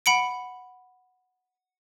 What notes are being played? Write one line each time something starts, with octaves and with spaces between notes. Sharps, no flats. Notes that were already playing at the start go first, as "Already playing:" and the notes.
F#5 B5 C#7 D7